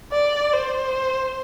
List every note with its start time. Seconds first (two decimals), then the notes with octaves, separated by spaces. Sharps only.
0.12 D5
0.53 C5